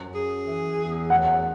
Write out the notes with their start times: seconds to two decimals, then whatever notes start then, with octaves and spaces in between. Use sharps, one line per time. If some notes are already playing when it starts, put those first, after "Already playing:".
Already playing: F#2
0.14 G#4
0.46 E3
0.78 E2
1.10 F#3 F#5